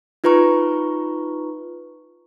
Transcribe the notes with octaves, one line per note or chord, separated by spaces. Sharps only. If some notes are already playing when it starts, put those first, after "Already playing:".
D#4 F4 B4 A#5 C#6